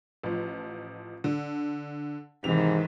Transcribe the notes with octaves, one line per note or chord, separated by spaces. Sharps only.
A1 F3
D3
G#2 C3 D#3 E3 F7